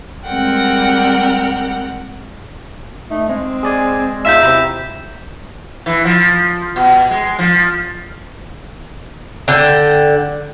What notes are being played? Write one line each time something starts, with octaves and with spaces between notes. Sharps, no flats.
G3 G#3 C4 A#4 F#5 G5
A3 D#4
G#3 C4
G#4 D5 G#5
E2 D#4 F4 E5 F5 G6 B6 E7
C3 C4 E4 A#5
E3
F3
B2
G#3
F3
D3 G5